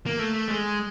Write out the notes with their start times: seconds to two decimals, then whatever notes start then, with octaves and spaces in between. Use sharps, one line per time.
0.06 A#3
0.19 A3
0.48 G#3